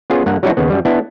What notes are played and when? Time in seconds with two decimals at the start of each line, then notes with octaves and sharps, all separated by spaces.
0.10 B3 C#4 F4 G#4
0.26 G2 A#3 F#5
0.43 F#3 G3 C#4 D#4 E4 F#4
0.57 D#2 C#3 B3
0.70 F#2 G3
0.85 B3 D4 E4